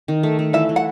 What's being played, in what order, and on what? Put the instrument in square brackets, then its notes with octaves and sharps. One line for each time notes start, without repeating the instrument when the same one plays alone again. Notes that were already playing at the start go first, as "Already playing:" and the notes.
[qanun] D#3
A3
A3
[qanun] E3 [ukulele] E5
[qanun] E3
[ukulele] F#5